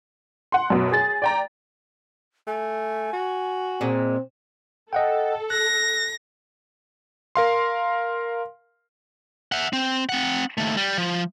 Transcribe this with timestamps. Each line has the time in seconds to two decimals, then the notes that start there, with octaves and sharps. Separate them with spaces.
0.52 F#5 C6
0.70 F#2 B2
0.92 G#4 A6
1.22 D5 G5 A#5
2.47 A3 G#5
3.13 F#4
3.81 A#2 G#3 C4
4.93 A4 D#5 F#5 G5
5.50 F#6 A#6
7.35 A#4 F5 C6
9.52 E5 F#5
9.73 C4
10.09 C4 F#5
10.58 D#2 A3
10.77 G3
10.98 F3